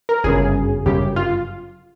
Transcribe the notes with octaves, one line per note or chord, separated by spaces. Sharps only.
A#4
G1 F#2 C#3 G#4
G1 F#2 C#3 G4
F4